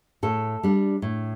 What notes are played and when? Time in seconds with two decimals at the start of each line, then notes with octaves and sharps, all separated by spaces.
0.23 A2 A4
0.63 G3 D4
1.02 A2